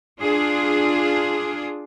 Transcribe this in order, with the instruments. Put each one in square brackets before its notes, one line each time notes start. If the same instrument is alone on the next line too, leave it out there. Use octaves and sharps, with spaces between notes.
[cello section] D4 F4 G#4